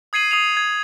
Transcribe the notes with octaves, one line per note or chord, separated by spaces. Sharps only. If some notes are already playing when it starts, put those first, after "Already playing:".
D#6 G#6 C7 D#7 F#7
D#6 C7 D#7 F7
G#6